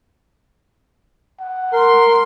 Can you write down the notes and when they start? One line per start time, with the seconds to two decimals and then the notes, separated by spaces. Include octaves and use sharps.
1.40 F#5
1.73 A#4 C6